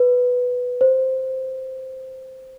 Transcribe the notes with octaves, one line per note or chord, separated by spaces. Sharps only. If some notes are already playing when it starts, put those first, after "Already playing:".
Already playing: B4
C5